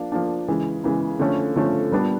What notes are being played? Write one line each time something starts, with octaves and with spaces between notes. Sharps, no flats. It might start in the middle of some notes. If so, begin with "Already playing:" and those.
Already playing: F3 A#3 D4
F3 A#3 D4
C#3 E3 G#3
C#3 E3 G#3
D3 F3 A3 C#4
D3 F3 A3 C#4
A#2 G3 B3 D4